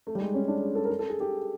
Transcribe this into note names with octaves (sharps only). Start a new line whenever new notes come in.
A3
G3
G#3
C#4
D4
G#4
A4
A#4
A4
A4
G#4
G4